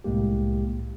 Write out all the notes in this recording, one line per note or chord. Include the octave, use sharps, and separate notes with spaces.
C2 A2 G#3 A#3 G4